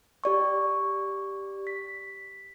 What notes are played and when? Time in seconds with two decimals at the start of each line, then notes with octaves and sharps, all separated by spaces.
0.24 G4 D5 C#6
1.67 B6